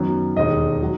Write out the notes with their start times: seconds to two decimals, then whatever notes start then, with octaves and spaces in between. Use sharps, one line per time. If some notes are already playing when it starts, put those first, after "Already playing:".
Already playing: F#2 D#3 F#3 B3
0.36 E1 D#2 D#3 G#3 D#5
0.82 D#3 F#3